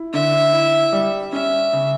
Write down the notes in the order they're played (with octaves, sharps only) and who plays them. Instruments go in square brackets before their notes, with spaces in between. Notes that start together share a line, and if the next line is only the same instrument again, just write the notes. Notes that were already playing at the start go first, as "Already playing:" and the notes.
Already playing: [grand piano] E4
[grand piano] D3 [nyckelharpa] E5
[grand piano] E4
G3
[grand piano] C#4 [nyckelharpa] E5
[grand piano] C#3